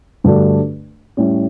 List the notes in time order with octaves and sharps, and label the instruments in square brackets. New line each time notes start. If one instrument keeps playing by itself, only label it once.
[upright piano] G2 D3 A3 D4 F#4
A2 G3 C#4